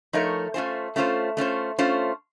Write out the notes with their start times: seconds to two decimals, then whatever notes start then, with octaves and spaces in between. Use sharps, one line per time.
0.13 F3 A3 D#4 A#4 C#5
0.54 A3 C#4 F4 C5
0.96 A3 C#4 F4 C5
1.37 A3 C#4 F4 C5
1.79 A3 C#4 F4 C5